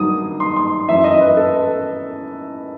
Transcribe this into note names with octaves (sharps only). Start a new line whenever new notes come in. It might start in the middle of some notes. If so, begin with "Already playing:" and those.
Already playing: G2 D#3 F#3 D#6
C6
C6
F#2 E3 E5
D#5
B4
A4